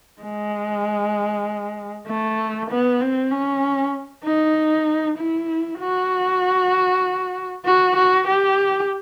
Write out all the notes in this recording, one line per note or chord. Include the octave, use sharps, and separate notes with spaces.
G#3
A3
B3
C4
C#4
D#4
E4
F#4
F#4
F#4
G4